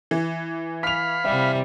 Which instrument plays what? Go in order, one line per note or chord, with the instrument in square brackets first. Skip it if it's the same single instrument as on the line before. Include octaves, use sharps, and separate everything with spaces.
[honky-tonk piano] E3
[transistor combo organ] F5 B5 [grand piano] B6 F7
[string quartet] C3 G3 [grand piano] E5